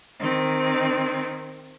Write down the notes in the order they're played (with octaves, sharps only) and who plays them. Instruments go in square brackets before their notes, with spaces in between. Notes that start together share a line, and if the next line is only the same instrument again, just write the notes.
[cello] D#3 C4